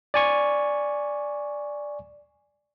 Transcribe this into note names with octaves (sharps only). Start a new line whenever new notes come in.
D5 G#5 C#6